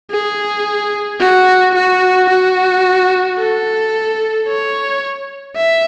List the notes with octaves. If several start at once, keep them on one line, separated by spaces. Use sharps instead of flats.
G#4
F#4
F#4
F#4
A4
C#5
E5